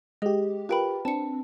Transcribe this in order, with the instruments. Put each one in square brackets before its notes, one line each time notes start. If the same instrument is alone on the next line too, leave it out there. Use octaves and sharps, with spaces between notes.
[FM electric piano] G#3 G4 [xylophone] G#4 D#5
[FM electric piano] F4 G4 A#4 [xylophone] B4 G5 B5
[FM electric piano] C4 D4 [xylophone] A5 C#7